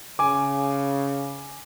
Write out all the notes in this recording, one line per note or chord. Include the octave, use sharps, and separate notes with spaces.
C#3 G#5 D6